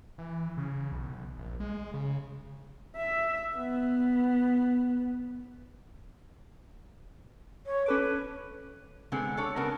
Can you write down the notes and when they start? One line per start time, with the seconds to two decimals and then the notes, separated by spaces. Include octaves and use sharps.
0.18 E3
0.57 C#3
0.92 B1
1.38 A#1
1.60 G#3
1.94 C#3
2.96 E5
3.56 B3
7.65 C#5
7.86 C#4 A4 B4 D6
9.12 D3 G#3 B3 C4
9.37 A4 C#5 D5
9.56 C#3 B3 A#4 A5